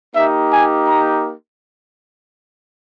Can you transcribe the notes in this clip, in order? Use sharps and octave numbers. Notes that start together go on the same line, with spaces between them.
A#3 D#4 G4 E5
G#5
A#5